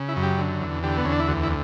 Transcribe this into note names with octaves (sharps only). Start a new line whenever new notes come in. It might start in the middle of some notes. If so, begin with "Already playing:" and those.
Already playing: C#3
E4
F#2
G4
D3
E2
D3 G4
B3
E2 C#4
D4
E4
D2 F#4
E4